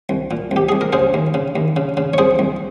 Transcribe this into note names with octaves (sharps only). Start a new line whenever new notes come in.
C2
A#2
C2 G4
C2 G#4
A#4
C#3 G#4 C5
D#2
C#3
D#2
C#3
C#3
C#5
C2 G#4 C5
C2